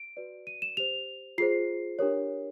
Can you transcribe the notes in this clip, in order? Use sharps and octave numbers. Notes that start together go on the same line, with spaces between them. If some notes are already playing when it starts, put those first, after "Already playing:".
Already playing: D7
F#4 B4 D5
D#7
E7
G4 C5 F7
F4 G#4 C5 C7
D4 G4 A#4 C#5